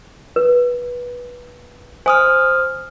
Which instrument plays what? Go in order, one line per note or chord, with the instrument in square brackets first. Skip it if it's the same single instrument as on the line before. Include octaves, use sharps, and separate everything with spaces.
[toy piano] B4
[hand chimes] C5 D#6 F6 [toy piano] G#5